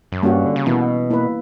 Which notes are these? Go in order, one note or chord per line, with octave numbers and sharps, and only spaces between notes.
F#2
G2 G3 A#3 C#4 F#4
D3
C#3
B2 E3 B3 E4
A#3 E4 B4